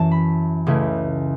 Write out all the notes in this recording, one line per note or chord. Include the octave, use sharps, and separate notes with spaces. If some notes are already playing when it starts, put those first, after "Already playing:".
Already playing: F#2 E3 C#4 E4 A5
B5
C#2 C#3 A3 E4